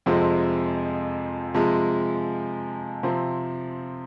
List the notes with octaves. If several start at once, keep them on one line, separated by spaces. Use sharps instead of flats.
F2 C3 F3 G#3 C4
C3 F3 G#3
C3 F3 C4